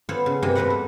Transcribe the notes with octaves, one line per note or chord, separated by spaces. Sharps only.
B3 F4 A4 C5 C#5
C#3
G2 C3 A#3 C5 G5 G#5
E2 A2 G#3 B4 D#5 F#5
A4